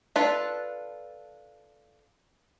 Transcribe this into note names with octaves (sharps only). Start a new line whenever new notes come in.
D4 F4 A4 B4